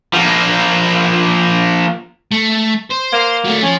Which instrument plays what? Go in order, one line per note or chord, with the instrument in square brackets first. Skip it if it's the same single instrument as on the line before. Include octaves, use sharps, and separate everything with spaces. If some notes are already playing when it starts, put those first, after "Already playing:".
[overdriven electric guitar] F3 A#3
[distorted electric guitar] A3
C5
[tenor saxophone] A#3
[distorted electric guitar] F#3 A3
[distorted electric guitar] F3 [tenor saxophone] C#4